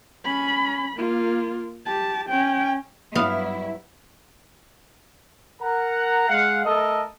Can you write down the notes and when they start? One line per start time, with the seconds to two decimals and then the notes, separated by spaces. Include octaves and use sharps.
0.25 C#4 B5
0.96 A#3 F4
1.86 G4 A5
2.29 C#4 G5
3.15 G2 F#3 B3 E4 F5
5.61 A#4 F#5 A#5
6.28 G#3 F5 F#5
6.65 A3 A4 A#4 D#5